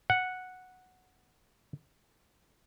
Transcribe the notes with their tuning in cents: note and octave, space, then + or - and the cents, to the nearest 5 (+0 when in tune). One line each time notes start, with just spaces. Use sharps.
F#5 -5